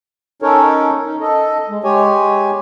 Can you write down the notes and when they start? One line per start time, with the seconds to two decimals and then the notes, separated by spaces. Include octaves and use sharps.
0.42 C#4 D#4 A4 A#4 C#5
1.05 C#4 D#4
1.20 A4 D#5
1.69 G#3
1.84 G#3 G4 C#5 G#5